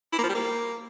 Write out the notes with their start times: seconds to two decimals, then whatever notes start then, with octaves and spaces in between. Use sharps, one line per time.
0.13 E4
0.18 A#3
0.24 F3
0.29 G3
0.35 A#3